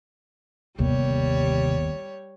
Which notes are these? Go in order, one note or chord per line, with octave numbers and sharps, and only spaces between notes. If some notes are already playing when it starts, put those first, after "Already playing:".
G1 D#2 C3 G3 C#5